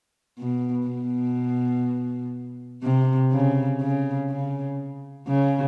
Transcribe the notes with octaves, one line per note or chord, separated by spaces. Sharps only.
B2
B2
C3
C#3
C#3
C#3
C#3